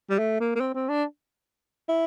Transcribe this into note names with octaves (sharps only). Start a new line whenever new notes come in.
G3
A3
A#3
A#3
C4
C4
D4
E4